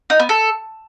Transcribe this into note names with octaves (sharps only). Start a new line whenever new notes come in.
D#4
B3
A4